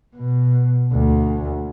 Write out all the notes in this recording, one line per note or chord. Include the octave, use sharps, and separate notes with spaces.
B2
D2